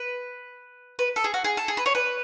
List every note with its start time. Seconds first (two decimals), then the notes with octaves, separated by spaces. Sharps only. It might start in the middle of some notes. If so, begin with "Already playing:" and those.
Already playing: B4
0.99 B4
1.16 A4
1.24 G#4
1.34 F#4
1.44 G#4
1.57 A4
1.68 G#4
1.77 B4
1.86 C#5
1.95 B4